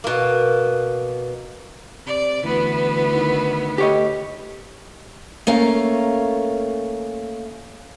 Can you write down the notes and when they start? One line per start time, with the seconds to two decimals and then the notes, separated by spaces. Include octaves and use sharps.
0.04 B2 A#3
2.06 C3 D5
2.43 D2 E3 B3
3.14 D#3
3.78 A3 G4 C#5 D#5
5.47 A3 A#3 C#4